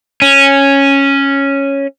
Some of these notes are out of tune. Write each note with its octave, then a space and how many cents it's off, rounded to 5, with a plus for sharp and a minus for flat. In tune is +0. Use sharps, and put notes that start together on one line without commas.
C#4 -5